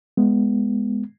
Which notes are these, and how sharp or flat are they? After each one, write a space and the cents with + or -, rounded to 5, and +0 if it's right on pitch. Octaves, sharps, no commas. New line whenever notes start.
G#3 +0 B3 +0